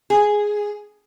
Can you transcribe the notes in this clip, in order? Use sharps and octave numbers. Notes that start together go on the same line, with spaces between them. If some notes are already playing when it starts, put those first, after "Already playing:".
G#4